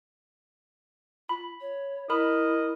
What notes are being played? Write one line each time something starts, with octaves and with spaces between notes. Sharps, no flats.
F4 B5
C#5
E4 A#4 D#5 B5